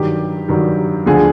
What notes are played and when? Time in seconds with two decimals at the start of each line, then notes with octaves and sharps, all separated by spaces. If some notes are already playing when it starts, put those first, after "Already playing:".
Already playing: G2 D#3 F#3 G4
0.48 G2 D#3 F#3
1.06 D2 D3 F3 G#4